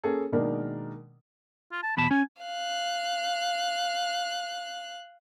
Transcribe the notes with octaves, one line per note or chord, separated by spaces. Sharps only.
A#3 C#4 G#4 A4
B2 D#3 G#3 A#3 D4 A#4
F4
A5
E2 B2 A5 B5
C#4 G#5
F5 F#6